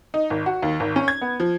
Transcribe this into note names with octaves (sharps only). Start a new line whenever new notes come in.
D#4
G#1
F#4
D#2
G#1
C#4
G#6
B3
F3